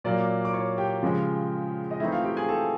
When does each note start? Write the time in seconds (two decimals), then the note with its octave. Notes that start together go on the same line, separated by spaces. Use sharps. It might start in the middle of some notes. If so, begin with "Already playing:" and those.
0.04 A#2 F#3 A#3 D5 D6
0.45 D6
0.53 C#5 C#6
0.78 G4 G5
1.03 C#3 F3 G#3
1.91 D#5
2.00 E3 A3 C4 D#4 E4 E5
2.12 F4 F5
2.24 G4 G5
2.37 G#4 G#5
2.49 A4 A5